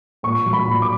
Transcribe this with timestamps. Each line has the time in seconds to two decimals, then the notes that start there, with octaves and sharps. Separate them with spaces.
0.23 A#2 C#6
0.46 F#3
0.53 B5
0.68 A#2
0.82 D6